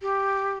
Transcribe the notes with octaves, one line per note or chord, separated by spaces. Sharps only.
G4